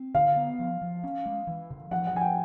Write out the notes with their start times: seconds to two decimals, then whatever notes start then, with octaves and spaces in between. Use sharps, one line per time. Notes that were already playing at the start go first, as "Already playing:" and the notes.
Already playing: C4
0.14 D3 F5
0.36 B3
0.59 F3
0.82 F3
1.04 C#4
1.26 G#3
1.47 E3
1.70 C#3
1.91 F3 F#5
2.07 F#5
2.13 F3 G#5
2.21 G5